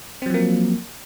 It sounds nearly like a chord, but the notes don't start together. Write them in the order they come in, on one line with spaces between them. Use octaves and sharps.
C4 F#3 F3 A#3